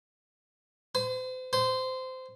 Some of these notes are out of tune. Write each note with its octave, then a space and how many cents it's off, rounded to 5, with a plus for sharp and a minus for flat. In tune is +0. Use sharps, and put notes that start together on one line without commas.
C5 -40
C5 -20